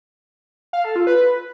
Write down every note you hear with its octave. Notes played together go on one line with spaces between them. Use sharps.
F5
A4
F4
B4